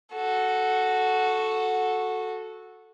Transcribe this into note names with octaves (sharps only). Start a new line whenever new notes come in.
F#4 A4